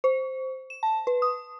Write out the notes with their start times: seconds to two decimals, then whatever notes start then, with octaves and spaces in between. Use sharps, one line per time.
0.04 C5
0.70 E7
0.83 A5
1.07 B4
1.22 D#6